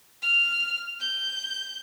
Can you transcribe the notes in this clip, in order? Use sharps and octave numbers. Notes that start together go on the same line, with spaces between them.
F6
G6